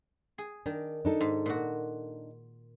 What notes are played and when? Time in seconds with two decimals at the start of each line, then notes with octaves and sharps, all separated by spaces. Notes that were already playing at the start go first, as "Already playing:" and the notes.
0.38 G#4
0.66 D#3 D4
1.05 D4 D#4 A4
1.21 G#2
1.46 A#2 F#4